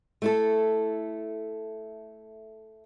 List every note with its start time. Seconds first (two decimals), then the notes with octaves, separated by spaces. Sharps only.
0.22 A3 E4 A4